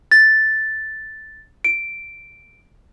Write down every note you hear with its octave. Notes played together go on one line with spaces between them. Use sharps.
A6
D7